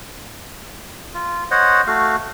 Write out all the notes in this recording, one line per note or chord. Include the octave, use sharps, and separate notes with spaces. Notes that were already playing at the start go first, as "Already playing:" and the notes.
F4
C5 C#5 D#5 F#5
A3 F#4 F5